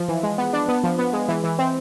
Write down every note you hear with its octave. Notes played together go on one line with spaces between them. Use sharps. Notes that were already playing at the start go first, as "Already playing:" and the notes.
Already playing: F3
E3
G#3
B3
D4
B3
F3
B3
G#3
E3
E3
C4